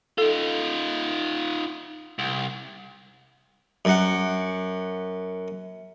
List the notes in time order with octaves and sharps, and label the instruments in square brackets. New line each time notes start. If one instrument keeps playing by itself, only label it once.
[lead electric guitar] D#4 F4 [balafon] A4
[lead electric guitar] C2
[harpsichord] F#2 F#5